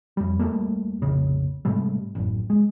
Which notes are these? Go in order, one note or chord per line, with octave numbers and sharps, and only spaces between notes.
F2 G3
E2 G3 A3 A#3
F1 A#1 C#3
G#2 C3 G3 A3
A1 F#2
G#3